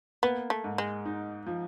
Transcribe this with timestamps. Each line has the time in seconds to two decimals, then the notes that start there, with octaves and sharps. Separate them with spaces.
0.23 A#3 B3
0.50 A3
0.64 G#2
0.78 G#3
1.05 D#4
1.46 F3